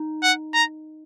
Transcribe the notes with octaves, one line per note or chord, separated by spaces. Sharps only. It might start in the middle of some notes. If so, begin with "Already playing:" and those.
Already playing: D#4
F#5
A#5